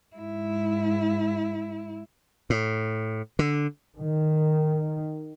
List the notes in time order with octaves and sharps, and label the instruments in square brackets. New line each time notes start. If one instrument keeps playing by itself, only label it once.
[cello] G#2 E4
[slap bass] A2
D3
[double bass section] D#3